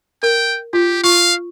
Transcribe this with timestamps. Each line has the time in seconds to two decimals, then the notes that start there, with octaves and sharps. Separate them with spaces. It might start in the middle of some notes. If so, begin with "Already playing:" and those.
0.23 A#4 G5
0.73 F4 G4
1.03 F4 F5 C#6